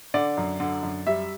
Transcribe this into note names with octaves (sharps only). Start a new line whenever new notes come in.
D3 D5
F#2
D3
F#2
G3 E5